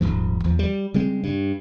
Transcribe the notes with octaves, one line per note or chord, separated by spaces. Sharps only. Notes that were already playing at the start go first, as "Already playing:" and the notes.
D#1 C#2 G#2 F3
E2 F3
G3
C#3 G3 G#3 C4
G2